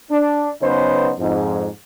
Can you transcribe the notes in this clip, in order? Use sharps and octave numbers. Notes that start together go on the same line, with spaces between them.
D4
C#3 F#3 B3 D#4 B4 C5
F2 G#2